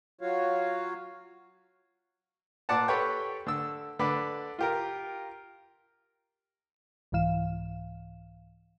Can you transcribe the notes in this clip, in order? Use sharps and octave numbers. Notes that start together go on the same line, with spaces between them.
F#3 F4 F#4 C#5 F5
A#2 D5 F#5 A5
G4 A4 B4 C#5 F#5 G5
D3 E6
D3 B4 D5
F4 G4 A#4
C2 G#2 E3 F5 E7